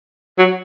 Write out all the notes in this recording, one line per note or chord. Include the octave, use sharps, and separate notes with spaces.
F#3